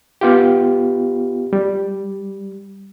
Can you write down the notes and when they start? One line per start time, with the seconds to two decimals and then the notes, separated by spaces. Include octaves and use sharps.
0.21 B3 F4 G4
1.53 G3